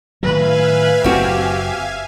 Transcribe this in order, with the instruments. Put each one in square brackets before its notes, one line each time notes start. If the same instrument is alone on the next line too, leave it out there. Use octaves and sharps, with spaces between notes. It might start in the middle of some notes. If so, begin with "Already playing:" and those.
[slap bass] A2 D#3 F#3 [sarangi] B4 [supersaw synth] E5 F5 G#5
[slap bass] F#1 [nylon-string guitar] C4 F#4 [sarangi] G4